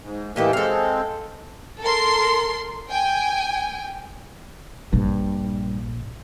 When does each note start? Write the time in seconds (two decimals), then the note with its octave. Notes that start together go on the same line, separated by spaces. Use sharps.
0.03 G#2
0.36 A2 E3 G#3 A#3 G4 A4
0.53 G#3 C4 A4 F5
1.80 A4 A#4 C6
2.90 G5 G#5
4.93 A#1 G2 A#2